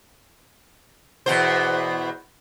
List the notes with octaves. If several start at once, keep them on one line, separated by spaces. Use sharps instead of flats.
E2 B2 C5